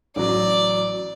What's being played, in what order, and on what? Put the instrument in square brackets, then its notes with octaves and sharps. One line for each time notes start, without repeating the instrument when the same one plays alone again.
[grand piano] A1 F#3 [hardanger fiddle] D5